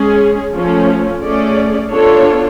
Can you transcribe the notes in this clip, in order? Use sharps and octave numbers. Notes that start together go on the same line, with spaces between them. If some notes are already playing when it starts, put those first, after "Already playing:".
Already playing: G#3 C#4 G#4
F3 A3 C#4
A3 C#4 G#4 D5
B3 D4 F4 A4 C#5